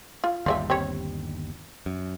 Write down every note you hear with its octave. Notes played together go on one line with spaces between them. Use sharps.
F4
G1 D#2 G3 F4 D5 E5
C4 G4 C#5
F#2